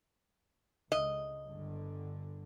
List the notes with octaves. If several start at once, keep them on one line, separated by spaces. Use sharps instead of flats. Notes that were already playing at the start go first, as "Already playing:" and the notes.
C#2 D#5
G1 D3